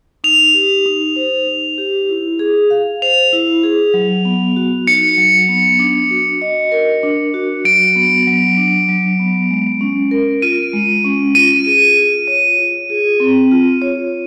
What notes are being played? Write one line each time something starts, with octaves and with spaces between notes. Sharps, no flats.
D#4 F7
G4
D#4
C5
D#4
G4
E4
G#4
F5
C5 F7
E4
G#4
F#3
B3
F#4
D#4 C#7
F#3
B3
D4
F#4
D#5
A#4
D4
F#4
F#3 D7
B3
F#3
D4
F#3
B3
G#3
C#4
A#4
F4 D#7
G#3
C#4
F4 D#7
G#4
F4
C#5
F4
G#4
C4
F4
C#5